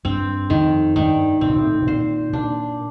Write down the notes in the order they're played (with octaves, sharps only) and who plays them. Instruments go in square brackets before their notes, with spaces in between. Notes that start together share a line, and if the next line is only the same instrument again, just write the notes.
[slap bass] G2 [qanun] C4
[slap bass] F2 [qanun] D#3
[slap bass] G2 [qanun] D#3
[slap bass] A2 [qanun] C4
[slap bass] A#2
A2
A2
[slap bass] A#2 [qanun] C5
[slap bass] A#2 [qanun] D4